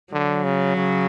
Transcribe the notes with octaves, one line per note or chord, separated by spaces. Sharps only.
D3 F#3
C#3
C#3